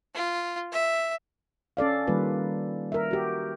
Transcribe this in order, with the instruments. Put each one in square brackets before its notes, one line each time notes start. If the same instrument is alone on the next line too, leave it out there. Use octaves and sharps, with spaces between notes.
[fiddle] F4
E5
[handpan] C#4 A4 D5 F5
D#3 G3 A#3 F4 B4
A#4 E5
F#4 G4